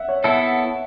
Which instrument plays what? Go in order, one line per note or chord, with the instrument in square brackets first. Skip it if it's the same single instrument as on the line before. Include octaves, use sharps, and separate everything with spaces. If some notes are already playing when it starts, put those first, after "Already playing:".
Already playing: [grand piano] E5 F#5
C#5
[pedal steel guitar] B3 E4 A4 [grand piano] E5